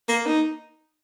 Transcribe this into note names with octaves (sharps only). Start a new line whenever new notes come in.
A#3
D#4